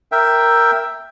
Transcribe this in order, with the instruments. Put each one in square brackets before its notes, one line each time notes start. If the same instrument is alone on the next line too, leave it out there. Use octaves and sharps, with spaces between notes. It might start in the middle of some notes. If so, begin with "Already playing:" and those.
[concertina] A#4 E5 G5